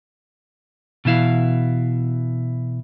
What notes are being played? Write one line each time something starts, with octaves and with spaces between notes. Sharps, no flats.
B2 E3 E4 F5